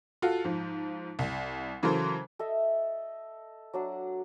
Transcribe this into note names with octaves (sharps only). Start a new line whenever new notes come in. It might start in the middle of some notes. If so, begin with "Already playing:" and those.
F4 F#4 A4
G#2 F3
C2
C#3 E3 F#3 A4 A#4 C5
A4 D#5 E5
F#3 D4 F#5